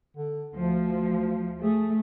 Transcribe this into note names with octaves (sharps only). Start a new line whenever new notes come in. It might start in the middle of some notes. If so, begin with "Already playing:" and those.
D3
D2 F3
A3 G#4